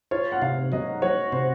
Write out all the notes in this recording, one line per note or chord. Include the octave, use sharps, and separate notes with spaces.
F4 C#5
F#5
C3 F5
F#3 D#5
F#4 C#5
C3 C5